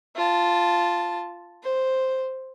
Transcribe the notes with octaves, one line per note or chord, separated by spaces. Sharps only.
F4 A5
C5